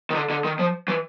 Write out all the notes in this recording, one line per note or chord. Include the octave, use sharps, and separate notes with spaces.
D#3
D3
D3
D#3
F3
E3